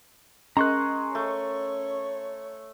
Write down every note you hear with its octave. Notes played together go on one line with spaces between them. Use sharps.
G#3 C#4 A#4 A#5 C#6 F#6
A3 C#5